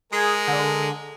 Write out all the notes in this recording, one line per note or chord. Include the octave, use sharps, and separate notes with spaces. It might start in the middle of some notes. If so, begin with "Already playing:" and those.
G#3 G#4 A#4
D3